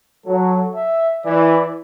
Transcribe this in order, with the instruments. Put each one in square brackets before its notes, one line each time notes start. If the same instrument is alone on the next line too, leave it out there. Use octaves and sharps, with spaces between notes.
[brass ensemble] F#3 [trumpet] A4
[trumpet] E5
[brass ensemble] E3 [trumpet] D5